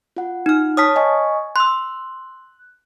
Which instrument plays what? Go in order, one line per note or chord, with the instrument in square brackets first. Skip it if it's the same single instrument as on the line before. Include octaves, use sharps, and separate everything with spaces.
[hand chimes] F4 F#5
[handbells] D#4 F6
[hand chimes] C#5 A5 [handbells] D#6 F6 B6
[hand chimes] D#5 G#5 C#6
[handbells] C6 E6 [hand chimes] F#6